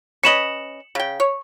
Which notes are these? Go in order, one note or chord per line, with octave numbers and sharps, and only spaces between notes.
C#4 B4 D#5 C#7 E7 F#7
C#3 G5
C#5